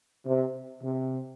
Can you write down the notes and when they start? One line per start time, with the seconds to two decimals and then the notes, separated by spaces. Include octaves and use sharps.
0.25 C3
0.84 C3